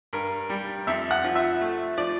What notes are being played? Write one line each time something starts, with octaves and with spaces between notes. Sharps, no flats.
G2 A#4
G3
F2 E5
F#5
F3
E5
A3
F3 D5